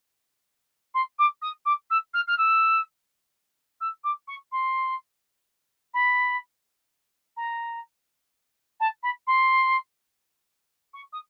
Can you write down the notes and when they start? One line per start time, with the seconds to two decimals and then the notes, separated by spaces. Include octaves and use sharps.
0.94 C6
1.19 D6
1.42 D#6
1.65 D6
1.90 E6
2.14 F6
2.28 F6
2.38 E6
3.81 E6
4.04 D6
4.28 C#6
4.52 C6
5.94 B5
7.37 A#5
8.80 A5
9.03 B5
9.27 C6
10.94 C#6
11.13 D#6